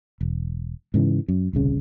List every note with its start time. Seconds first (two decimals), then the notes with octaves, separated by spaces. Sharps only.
0.21 E1
0.94 G#2 C#3 E3
1.28 F#2
1.53 D#1 C2 C#3